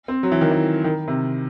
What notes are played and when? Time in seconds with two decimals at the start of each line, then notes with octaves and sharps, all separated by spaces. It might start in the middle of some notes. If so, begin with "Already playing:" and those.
0.08 C4
0.23 F#3
0.32 E3
0.41 D#3
0.51 E3
0.84 D#3
1.08 C3